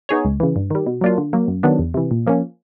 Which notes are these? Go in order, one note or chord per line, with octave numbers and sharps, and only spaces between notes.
B3 D#4 G#4 C#5
C#2
C#3 E3
G2
D#3 G3
B2
F#3 A#3 D4 F4
D3
F#3 A#3
F#2
D#3 F#3 B3 D4
E2
C3 E3
A#2
F3 A#3 C#4